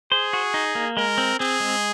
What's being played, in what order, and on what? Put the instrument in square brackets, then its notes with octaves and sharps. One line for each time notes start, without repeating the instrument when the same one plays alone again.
[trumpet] G#4 [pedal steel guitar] C5
[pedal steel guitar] F#4
D#4
A#3
[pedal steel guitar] G#3 [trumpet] A#4
[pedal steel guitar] C4
[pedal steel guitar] C4 [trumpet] G#4
[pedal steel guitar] G#3